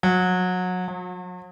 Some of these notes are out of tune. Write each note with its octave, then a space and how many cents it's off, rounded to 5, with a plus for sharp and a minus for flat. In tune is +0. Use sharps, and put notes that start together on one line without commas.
F#3 -25
F#3 -45